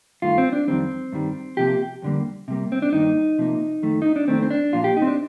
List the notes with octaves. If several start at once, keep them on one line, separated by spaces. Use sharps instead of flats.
G2 D#3 A3 F4
C4
D4
F2 D#3 G3 C4
G2 D#3 G3
C3 F3 A#3 G4
F2 D3 G3 A#3
C3 G3 A#3
C4
D4
G2 D#3 A#3 D#4
C3 F3 A#3
F2 D#3 A3
D#4
D4
F2 D#3 A3 C4
C4
D4
A#2 F3 A#3 F4
G4
D#4
C4
D4